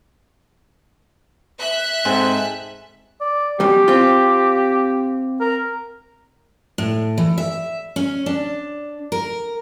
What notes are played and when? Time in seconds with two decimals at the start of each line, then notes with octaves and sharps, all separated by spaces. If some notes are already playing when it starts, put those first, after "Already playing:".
1.58 E5 F#6
2.05 G#2 C4 A4 G#5
3.21 D5
3.60 F#2 B2 G3 G4
3.88 C4 F4
5.41 A#4
6.78 A2
7.18 E3
7.38 E5
7.96 C#4
8.26 D4
9.12 A#4